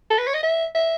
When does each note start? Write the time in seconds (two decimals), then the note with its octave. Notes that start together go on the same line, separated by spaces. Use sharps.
0.10 A4
0.18 B4
0.27 C#5
0.34 D#5
0.43 E5
0.75 E5